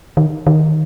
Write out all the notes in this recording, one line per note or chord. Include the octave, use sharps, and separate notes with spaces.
D#3
D#3